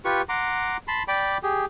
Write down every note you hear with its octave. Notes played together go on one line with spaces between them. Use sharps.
F4 G4 B4 C#6
F#5 A#5 C6 D6
A5 B5 C6
D5 G5 B5 D6
G4 G#4